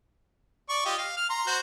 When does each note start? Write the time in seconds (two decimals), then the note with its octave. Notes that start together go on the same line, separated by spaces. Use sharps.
0.69 D5 C#6
0.85 F4 G4 D#5
0.98 F5
1.17 F6
1.30 A#5 C6
1.47 F#4 C5